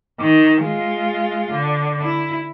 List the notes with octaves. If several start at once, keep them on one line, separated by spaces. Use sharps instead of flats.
D#3
G#3 F4
D3
E4